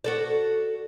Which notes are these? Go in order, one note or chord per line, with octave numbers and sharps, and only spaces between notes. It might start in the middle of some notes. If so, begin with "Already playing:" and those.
F#4 A4 D5